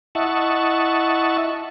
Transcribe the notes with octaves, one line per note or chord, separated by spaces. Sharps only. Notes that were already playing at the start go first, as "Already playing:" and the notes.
E4 D#5 E5 F#5 A5 C#6